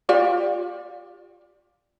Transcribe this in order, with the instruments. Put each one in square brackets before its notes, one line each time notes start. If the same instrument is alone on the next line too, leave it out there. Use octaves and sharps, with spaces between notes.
[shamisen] F4 G4 D5